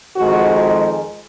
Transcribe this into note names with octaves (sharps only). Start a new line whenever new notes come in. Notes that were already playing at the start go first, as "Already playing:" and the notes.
F2 D#3 G#3 F#4